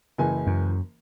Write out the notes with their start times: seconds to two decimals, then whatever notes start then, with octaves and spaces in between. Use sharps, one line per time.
0.18 F#1 E3 G#5
0.47 F#2